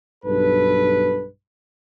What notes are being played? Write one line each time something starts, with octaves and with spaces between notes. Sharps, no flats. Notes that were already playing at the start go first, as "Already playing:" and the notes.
B1 G2 A4 B4